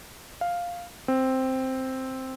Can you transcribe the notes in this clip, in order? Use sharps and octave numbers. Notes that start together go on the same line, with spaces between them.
F5
C4